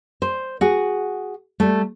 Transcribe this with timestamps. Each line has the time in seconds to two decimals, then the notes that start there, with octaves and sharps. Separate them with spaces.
0.22 C5
0.61 F#4 G#4
1.60 G3 A3